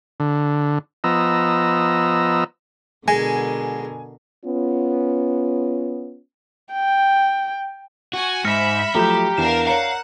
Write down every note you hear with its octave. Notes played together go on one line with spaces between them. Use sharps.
D3
F3 B3 D#5 A#5 E6
B2 D3 G#3 A#4 G#5
B3 C#4 F4
G5
F#4 G#5
G#2 E5 B5 F6 A#6 C#7
F3 F#3 A3 G4 A#5 G6
E2 D4 A#4 F5 E7
C#5 F5 F#5 A#5